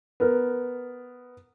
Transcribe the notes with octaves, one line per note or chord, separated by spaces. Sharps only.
B3 A#4